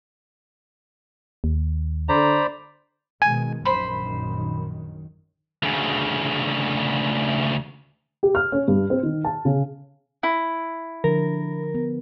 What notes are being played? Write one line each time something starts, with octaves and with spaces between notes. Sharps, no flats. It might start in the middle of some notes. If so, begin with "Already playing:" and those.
D#2
D3 C5 D5 A#5 B5
B2 D#3 G#3 G#5
A#1 F#2 D#3 C5 B5
D2 C#3
G4
F6
C#4
G2
C4
D#3
A5
C#3
E4
D3 F3 A#4
B3